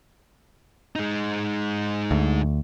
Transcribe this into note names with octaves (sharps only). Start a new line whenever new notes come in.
G#3 D#4
D2